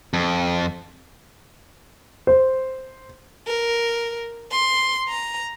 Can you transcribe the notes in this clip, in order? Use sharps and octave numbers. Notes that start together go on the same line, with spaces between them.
F2
C5
A#4
C6
A#5